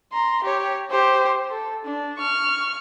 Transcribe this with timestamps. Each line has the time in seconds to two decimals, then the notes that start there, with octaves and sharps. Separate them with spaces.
0.13 A#5 C6
0.44 G4 C#5
0.91 G4 C5
1.50 A4
1.85 D4
2.18 C#6 F6